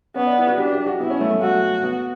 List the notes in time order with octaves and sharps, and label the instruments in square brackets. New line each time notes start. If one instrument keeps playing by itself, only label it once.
[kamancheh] B3 [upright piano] C#4
[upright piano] D4
E4
F#4
[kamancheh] D4 [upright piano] G4
[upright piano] G4
F#4
[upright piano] B3 [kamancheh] E4
[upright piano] C#4
A3
A3
[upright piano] A3 [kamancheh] F#4
[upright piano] B3